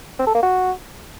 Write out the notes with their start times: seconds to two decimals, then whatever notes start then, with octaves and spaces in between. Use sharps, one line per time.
0.19 C4
0.27 A4
0.35 A#3
0.43 F#4